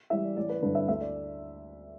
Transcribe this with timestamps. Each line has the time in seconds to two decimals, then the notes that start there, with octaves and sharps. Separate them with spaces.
0.10 E3 G3 E5
0.24 D5
0.37 A1 D5
0.49 B4
0.62 G2 D3 B4
0.75 E5
0.88 D2 E5
1.01 D5